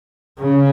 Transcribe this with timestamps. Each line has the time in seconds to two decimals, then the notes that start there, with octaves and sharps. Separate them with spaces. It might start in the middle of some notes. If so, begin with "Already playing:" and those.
0.41 C#3